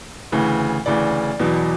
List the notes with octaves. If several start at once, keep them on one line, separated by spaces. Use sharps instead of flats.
D2 C#3 E3
D2 C#3 E3 D5
E2 B2 F#3